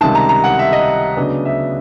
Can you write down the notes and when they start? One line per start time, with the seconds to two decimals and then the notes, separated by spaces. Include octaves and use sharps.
0.01 C#2 C3 D#3 G3 A5
0.15 A#5
0.29 A#5
0.44 F#5
0.59 E5
0.72 D#5
1.16 D2 C#3 F#3 B3 D4
1.45 E5